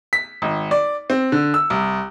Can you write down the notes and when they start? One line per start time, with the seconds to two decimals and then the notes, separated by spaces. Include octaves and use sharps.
0.13 B6
0.42 G#1
0.71 D5
1.10 C4
1.32 D3
1.54 E6
1.70 C2